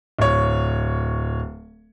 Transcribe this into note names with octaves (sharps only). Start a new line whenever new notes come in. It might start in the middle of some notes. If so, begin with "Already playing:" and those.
D1 C#5